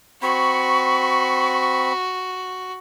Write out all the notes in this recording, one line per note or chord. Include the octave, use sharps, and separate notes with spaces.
C4 F#4 B5 C#6